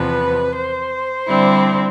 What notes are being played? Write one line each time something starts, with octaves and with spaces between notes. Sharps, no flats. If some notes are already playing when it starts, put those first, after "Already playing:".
Already playing: E2 C3 F3 B3 B4
C5
D3 G3 C4 E4